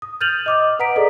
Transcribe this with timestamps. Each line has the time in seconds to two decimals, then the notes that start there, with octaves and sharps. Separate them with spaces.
0.02 D#6
0.21 F6 G6 A6 D#7 F7 F#7
0.46 D#5 D6 D#6
0.79 B4 F#5 A#5 B6 D7
0.96 G#4 A4 D5 D#5